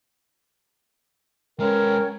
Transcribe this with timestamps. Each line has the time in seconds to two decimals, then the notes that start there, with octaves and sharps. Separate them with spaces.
1.60 G#3 C#4 A#4 B4 C#5 G5